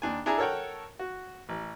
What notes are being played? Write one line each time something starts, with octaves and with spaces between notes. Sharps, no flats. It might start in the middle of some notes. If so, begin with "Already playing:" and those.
D#2 D4 G#5
D4 E4 G#4 G#5 A#5
A4 A#4 C#5 F#5 G5
F#4
A1